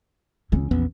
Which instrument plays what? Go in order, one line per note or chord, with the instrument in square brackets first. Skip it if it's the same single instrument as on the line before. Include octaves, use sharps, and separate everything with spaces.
[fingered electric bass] C#2 [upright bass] E3 C#4
[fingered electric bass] A#1 E2 B3